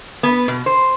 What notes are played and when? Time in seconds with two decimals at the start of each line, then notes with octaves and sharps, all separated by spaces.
0.23 B3
0.48 B2
0.66 C5